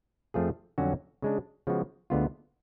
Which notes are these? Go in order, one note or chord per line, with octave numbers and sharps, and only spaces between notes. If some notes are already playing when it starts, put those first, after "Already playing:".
F2 F3 A3 F4 G#4
F2 D3 F#3 C#4 F#4
C#3 G#3 D4
C#3 F3 G#3 B3 F#4
D2 D3 G#3 B3 F4